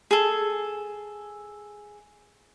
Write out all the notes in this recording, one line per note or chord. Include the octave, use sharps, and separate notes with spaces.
G#4 A4